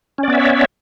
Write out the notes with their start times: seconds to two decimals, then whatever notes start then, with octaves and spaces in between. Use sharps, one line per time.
0.18 C#4
0.23 D5
0.28 B3
0.33 E5
0.37 C#5